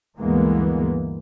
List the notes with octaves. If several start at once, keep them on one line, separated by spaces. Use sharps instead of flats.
D2 G2 E3 G#3 A#3 B3